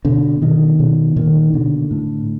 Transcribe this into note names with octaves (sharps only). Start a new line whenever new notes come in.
B2 D3
B2 D#3
B2
A#2 D#3
B2 D3
A2